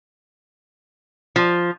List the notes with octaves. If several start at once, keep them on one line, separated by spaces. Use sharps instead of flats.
F3